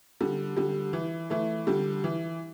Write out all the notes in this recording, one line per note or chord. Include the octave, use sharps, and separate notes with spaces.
D3 G3
D3 G3
E3
E3 A3
D3 G3
E3